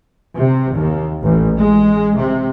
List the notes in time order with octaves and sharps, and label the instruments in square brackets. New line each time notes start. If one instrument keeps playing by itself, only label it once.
[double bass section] C3
D#2
A1
G#3
C3